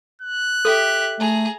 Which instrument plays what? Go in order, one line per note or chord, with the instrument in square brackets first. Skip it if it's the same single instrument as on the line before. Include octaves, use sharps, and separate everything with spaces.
[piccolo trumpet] F#6
[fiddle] G4 E5 [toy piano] A4
[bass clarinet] A3 [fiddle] G#4 A#5